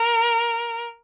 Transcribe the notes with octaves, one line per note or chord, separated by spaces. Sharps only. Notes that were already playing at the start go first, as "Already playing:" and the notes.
Already playing: A#4